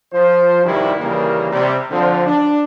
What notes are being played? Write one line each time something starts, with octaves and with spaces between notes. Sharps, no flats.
F3 C5
C2 G2 D#3 G3 E4 F#4
D#2 C#3 E3 G3 A#3
C3 G3
D3 F3 C4
D4